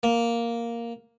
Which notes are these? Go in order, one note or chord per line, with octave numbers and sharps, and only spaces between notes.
A#3